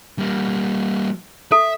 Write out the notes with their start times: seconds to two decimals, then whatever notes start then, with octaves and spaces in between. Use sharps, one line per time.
0.19 G3 A#3
1.52 A4 E5